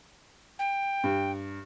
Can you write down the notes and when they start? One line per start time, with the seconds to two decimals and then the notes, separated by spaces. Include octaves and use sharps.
0.59 G5
1.04 G2